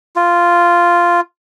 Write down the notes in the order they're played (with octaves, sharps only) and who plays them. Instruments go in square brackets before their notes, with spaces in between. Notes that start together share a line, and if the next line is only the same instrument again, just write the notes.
[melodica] F4